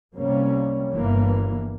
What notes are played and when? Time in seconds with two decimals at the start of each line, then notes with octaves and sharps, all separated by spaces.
0.15 C2 C3 G3 A#3 C#4
0.90 G1 G2 E3 A#3